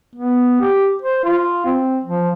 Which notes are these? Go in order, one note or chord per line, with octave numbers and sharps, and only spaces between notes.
B3
G4
C5
F4
C4
F3